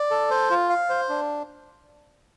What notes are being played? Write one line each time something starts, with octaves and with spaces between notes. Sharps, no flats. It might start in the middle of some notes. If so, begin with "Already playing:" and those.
Already playing: D5
A4
C5
F4
F5
C5
D4